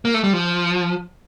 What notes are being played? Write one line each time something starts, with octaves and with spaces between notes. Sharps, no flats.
A#3
A3
G3
F3